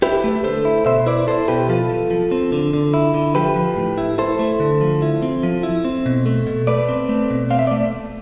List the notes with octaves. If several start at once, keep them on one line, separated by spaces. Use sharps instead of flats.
E4 G4 B4
A3
D3 A4 C5
E4
B2 C5 E5
E4 B4 D5
E4 A4 C5
B2 G4 B4
F3 F4 A4
F3
F3
C4
D3
D3
E4
D3
F3 G4 B4
F3
A2
E4
E4 A4 C5
A3
D3
F3
E4
C4
F3
E4
C4
B2
A3
B2
A3 B4 D5
C4
A3
B2
C4 F5
E5
D5
A3